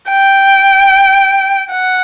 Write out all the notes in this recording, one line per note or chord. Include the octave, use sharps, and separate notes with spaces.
G5
F#5